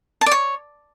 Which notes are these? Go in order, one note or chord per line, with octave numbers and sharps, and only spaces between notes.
A5
D5
C#5